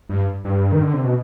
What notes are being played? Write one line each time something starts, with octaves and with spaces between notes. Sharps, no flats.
G2
G2
D#3
D3
C3
B2